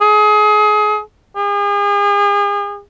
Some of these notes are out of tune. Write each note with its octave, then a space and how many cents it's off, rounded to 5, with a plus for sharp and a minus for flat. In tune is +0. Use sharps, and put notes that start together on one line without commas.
G#4 +25
G#4 -40